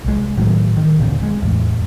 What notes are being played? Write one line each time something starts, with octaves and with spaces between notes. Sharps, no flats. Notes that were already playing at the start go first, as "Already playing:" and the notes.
C2 G#3
A2 D#3 F#3
D#3
D#2 A#2 D3 C4
G#3
E2 A2